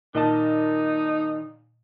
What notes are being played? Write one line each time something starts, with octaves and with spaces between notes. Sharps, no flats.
A#2 D#3 D#4 D#5 A5